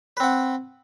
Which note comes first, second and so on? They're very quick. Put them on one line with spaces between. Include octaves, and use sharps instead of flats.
B4 C4 F#5